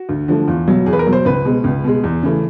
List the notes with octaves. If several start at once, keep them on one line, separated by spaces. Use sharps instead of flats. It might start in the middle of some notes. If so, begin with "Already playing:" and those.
Already playing: F#4
D2
D3 F3 A3
E2 F4
B2 F#3
E2 G#4
B4
A#4
B2 F#3
C5
C#2 B4
B2 G#3
C#2
B2 G#3
E2
C#3 E3 A3